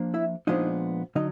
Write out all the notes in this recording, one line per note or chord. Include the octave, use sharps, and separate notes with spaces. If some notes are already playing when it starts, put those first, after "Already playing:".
Already playing: F3 A#3 D4
E4 E5
A#2 F3 G#3 B3 D4 D#4 D#5
D3 F#3 D#4 D#5